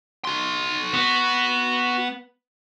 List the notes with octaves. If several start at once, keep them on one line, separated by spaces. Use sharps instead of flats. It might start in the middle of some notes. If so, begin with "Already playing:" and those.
F#4 C6
B3